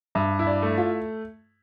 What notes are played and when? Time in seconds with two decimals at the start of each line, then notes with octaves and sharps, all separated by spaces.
0.15 G2 E5
0.39 E4
0.47 D5
0.62 A3
0.78 F4